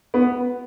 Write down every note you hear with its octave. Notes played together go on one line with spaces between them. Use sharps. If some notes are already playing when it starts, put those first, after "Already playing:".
B3